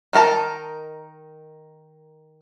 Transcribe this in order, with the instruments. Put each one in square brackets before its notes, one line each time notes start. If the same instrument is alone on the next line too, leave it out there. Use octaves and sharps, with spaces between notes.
[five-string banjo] D#3 D#4 A#4 A5 A#5